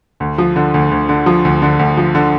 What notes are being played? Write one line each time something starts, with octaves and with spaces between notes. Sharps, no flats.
D2
F3
D3
D2
D2
D3
F3
D2
D3
D2
F3
D3